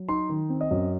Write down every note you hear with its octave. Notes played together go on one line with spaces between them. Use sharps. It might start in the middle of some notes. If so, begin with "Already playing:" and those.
Already playing: F#3
D#4 C6
D#3
C4
D#5
F#2